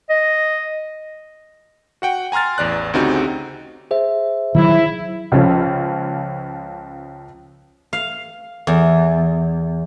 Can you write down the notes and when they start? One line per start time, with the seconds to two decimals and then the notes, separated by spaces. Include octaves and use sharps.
0.09 D#5
2.02 F#4 F#5 G5
2.32 G#5 A#5 C6 F6 A6
2.58 A1 E2 D5 F#6
2.94 D2 C#3 C4 D#4 F#4 G4
3.91 G#4 C5 E5
4.55 D#3 E3 F#3 E4
5.32 C#2 F3 C#4
7.93 F5
8.67 E2